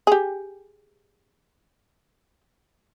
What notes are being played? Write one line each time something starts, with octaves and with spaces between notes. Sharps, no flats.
G4 G#4